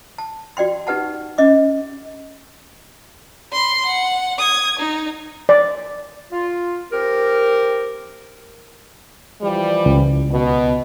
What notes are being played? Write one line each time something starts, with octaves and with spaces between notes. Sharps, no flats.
A5
F#4 D5 G5 C6
D#4 G4 B4 F#5 A5
C#4 D#5 D6
B5 C6
F#5
D#6 G#6
D#4
D5
F4
C4 G4 A#4
E3 F3 G3
C#2
B2